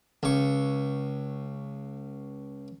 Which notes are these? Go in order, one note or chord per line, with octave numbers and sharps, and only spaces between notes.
C#2 C#6